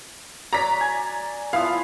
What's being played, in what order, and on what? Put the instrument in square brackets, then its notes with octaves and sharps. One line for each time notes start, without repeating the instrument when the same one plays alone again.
[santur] F#3 D5 [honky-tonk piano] A#5 B6
[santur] G#5
[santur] F3 B3 E4 [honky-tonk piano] F5